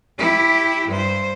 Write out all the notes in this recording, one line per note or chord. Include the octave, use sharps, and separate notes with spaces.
E4 G4
G2 C5